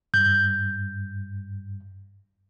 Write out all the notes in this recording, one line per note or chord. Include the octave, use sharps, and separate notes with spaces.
G2 G6